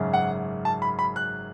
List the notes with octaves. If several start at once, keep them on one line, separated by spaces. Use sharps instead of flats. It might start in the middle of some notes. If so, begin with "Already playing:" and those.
Already playing: G#1 F#2 C#3
F#5
A5
B5
B5
F#6